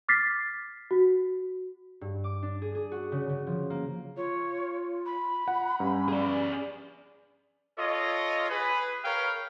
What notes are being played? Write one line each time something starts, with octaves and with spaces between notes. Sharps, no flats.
D6 F6 A6 B6 C7
F#4
G2
D6
D4
G#4
G#4
F#4
C#3
C#3
F3
A#3
F4 C#5
B5
F#5
G2 C#4
G#4 D5
F4 A4 C#5 D#5
G#4 B4
A#4 B4 C#5 F5 G5